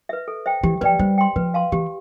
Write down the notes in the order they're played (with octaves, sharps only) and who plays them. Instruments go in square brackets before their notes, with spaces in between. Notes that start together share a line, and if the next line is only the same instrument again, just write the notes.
[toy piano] B4 E5
A4
C5 E5 G5
[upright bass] E3 [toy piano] G4
[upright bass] F3 [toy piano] B4 D5 G5
[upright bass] G3 [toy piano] C5
[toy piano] G5 C6
[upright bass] F3 [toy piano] B4
[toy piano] F5 A5 C6
[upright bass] E3 [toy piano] G4